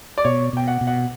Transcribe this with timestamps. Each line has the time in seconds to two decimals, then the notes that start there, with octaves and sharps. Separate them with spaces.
0.18 D5
0.25 B2 C#5
0.53 B2 G5
0.67 F#5
0.81 B2
0.87 F#5